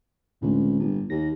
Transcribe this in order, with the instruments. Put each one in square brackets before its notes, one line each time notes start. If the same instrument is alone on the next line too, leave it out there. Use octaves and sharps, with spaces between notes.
[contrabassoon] C#2 [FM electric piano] A2 D3 C4
[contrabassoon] G1
[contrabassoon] D#2 [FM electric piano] A#6